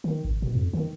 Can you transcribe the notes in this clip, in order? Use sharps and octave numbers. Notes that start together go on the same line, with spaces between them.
D#3
G#1
B2
F2
D#3